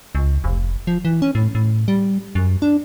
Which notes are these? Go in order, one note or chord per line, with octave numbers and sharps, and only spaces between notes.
C#2
F1
F3
E3
C#4
A2
A2
G3
F#2
D4